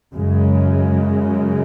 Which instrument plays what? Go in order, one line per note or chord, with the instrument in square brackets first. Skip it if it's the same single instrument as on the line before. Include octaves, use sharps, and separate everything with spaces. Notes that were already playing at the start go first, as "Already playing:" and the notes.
[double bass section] F#2 C#3 G#3